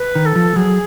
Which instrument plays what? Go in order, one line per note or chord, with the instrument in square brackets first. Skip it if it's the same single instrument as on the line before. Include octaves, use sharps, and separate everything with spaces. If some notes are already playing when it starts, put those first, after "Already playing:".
Already playing: [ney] B4
[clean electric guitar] D#3
[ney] A4
[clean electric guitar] F3
[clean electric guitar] F#3 [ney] G#4